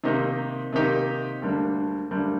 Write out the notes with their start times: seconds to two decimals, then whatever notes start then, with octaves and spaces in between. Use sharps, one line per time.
0.04 C3 D#3 A#3 D#4 G4
0.73 C3 D#3 A#3 D#4 G4
1.42 D2 D3 G3 A#3 D4
2.11 D2 D3 G3 A#3 D4